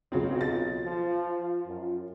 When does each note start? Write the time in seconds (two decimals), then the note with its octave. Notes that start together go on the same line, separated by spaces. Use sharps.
0.12 B1 C#3 F#3 C4 F4
0.41 A6
0.85 F3
1.66 F#2